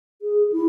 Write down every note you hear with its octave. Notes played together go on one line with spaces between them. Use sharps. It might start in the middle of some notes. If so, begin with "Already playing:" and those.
G#4
E4